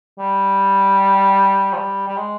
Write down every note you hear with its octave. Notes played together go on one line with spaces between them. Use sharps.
G3
F3
G3
G3
G#3